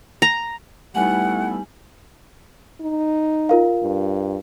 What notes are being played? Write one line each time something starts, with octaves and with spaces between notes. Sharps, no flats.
A#5
G3 A3 B3 D#4 E4 F#5 G#5 F#7
D#4
F4 A#4 F5
G2